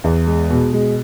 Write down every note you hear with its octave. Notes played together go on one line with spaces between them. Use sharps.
E2
G#3
B2
G#3